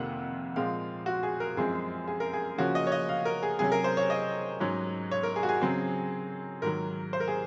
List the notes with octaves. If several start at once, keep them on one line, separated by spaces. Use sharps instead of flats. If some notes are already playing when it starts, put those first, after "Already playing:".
Already playing: F2 C3 D#3 A#3 F#5
A#2 F3 G#3 C4 F5
F#4
G#4
A#4
F#2 F3 G#3 C4 G#4
G#4
A#4
G#4
C#3 F3 A#3 C#4 F#4
D#5
C#5
D#5
F5
A#4
G#4
C3 F#3 C#4 G#4
A#4
C5
C#5
D#5
G#2 F#3 C#4
C#5
A#4
G#4
F#4
G#4
C#3 F#3 C4
G#2 D#3 F#3 A#4
C5
A#4
G#4